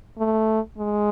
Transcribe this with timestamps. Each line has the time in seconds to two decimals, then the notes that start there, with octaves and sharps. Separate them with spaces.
0.18 A3
0.78 G#3